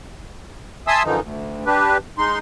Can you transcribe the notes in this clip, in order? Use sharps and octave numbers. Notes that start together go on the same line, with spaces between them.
E5 G#5 A5 C6 D#6 E6
F#2 D3 E3 F3 D#4
D2
D4 G4 B4
G#3 D#4 C6